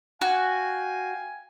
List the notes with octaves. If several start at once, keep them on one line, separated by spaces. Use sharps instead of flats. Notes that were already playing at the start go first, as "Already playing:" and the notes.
F#4 F5 G5 G#5